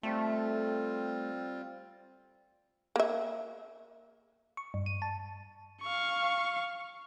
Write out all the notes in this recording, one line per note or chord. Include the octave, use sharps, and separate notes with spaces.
G3 A3 C4 F4
A#3 E5
C#6
G2
D#7
A5
F5 C#6